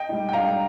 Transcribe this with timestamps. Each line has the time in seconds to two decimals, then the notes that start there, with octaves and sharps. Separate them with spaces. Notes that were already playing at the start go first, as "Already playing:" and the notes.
Already playing: D#5 G5
0.09 G3 D#4
0.29 G5
0.33 G2 F5 A#5